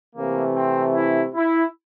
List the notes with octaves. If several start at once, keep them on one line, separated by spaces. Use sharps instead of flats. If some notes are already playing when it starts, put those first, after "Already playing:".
C3 E3 A3 A#3
C4
E4
E4